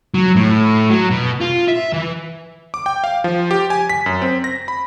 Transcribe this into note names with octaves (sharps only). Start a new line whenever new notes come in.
F#3
A2
F#3
B2
F4
E5
E3
D6
G5
F5
F3
G4
G#5
B6
F#2
C4
A#6
B5